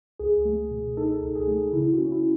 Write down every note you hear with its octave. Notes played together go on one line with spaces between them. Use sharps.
C#2 G#4
A3
B2
D#4 A4
C#2
G#4
A3
C#3 E4
F#4
C#4
E4